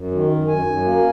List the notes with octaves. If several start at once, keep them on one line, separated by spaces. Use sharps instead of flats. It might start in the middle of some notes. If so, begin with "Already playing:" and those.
Already playing: F#2
D#3
F#2
F#2 G#5
F#2
A#3